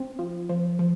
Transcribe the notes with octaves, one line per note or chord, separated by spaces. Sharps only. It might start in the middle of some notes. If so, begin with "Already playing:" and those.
Already playing: C4
F3
F3
F3